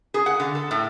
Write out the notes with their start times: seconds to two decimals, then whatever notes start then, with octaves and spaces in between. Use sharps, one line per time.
0.14 G#4
0.26 F#5
0.40 D3
0.55 A4
0.71 A2